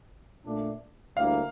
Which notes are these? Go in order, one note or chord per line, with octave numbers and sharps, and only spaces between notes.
A#2 A3 D4
D2 D3 G3 A#3 E4 F5